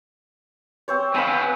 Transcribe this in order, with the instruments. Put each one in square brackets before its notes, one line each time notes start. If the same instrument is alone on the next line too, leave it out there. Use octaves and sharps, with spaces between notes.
[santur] C4 C5 C#5
[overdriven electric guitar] C4 B4 [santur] F5 G#5